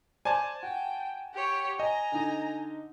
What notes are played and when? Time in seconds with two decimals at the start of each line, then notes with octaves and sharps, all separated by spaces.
0.25 C5 D5 G#5 A5 G#6
0.63 F#4 G5
1.34 G4 C#5
1.80 D#5 G#5 A#5
2.12 D3 D#4